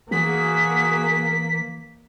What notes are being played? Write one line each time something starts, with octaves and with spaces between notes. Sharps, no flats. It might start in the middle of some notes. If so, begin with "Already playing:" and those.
E3 A#3 F#4 G#4 B6